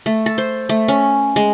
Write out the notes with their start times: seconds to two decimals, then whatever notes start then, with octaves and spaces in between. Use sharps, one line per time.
0.06 A3
0.26 A4
0.38 C5
0.69 A3
0.88 C#4
1.36 G#3